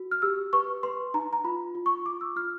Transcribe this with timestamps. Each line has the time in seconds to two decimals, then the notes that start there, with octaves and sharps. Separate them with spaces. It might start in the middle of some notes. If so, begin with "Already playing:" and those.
Already playing: F#4
0.11 F6
0.22 G4 E6
0.53 B4 C#6
0.83 B4 C6
1.14 D#4 A#5
1.33 A#5
1.44 F4 B5
1.75 F4
1.86 C#6
2.06 F4 D6
2.21 E6
2.36 F4 F6